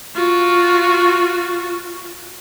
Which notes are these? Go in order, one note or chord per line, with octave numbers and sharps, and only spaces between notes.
F4 F#4